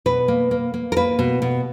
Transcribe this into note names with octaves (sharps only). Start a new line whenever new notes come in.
B2 B4
A#3
A#3
A#3
A#4
A#3 B4
B2
B2